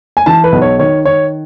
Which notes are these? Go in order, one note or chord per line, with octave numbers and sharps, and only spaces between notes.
G#5
E3 A5
B4
B1
C#5
D#3 C#5
D#3 C#5